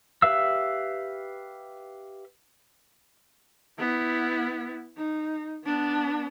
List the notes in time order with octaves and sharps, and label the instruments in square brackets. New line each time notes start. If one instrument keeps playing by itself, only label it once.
[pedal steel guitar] G4 B4 E5 F5 E6
[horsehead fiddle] B3 E4
D#4
B3 D4